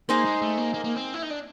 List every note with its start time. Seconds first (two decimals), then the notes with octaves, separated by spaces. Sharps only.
0.09 A#3 D#4 G#4 C5
0.25 G#3
0.41 A3
0.58 A#3
0.74 A#3
0.84 A#3
0.95 C4
1.14 E4
1.22 D#4
1.30 D4